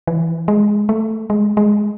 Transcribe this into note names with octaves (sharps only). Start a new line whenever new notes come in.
E3
G#3
A3
G#3
G#3